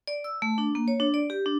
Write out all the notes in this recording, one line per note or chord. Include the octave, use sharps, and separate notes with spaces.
D5
E6
A3
D4
A#3
C#5
D4
D5
G4
D4